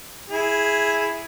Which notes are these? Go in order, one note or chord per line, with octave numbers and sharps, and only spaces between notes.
E4 G#4